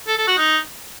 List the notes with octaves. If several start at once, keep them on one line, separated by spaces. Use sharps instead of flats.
A4
A4
F#4
D#4